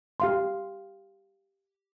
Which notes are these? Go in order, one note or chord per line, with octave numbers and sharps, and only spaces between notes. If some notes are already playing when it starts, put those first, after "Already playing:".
G4 F5 C6